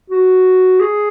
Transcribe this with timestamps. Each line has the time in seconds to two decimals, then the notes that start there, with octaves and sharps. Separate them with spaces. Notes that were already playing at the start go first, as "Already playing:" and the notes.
0.10 F#4
0.80 G#4